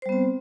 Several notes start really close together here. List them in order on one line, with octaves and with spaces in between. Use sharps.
C5 G3 B3 C4